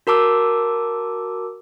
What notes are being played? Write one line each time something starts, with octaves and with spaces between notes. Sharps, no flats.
F#4 A#4 A5 D6 E6